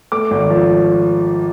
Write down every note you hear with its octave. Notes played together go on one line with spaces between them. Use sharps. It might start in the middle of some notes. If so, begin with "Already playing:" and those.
A3 D6
G#1
F3